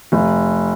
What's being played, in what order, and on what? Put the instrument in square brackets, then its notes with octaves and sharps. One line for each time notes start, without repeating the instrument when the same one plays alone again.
[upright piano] F1